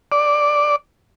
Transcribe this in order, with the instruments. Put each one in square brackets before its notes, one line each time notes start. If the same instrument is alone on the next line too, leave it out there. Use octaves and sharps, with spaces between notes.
[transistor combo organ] D5